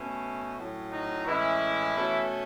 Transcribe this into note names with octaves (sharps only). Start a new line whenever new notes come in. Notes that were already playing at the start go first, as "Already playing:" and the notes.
Already playing: B2 A3 C#4
A2 F#3 C#4
D#4
A2 E3 G#3 C#4 E4
B2 A3 C#4